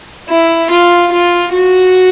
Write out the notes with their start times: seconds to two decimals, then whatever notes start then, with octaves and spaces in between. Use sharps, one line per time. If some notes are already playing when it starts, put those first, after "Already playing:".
0.28 E4
0.70 F4
1.12 F4
1.53 F#4